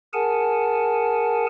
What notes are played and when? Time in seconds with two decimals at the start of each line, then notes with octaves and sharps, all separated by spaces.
0.13 G#4 A#4 F#5 G#5 A5